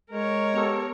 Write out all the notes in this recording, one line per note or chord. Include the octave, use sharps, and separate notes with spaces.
G#3 A#4 C#5
B3 G4 A4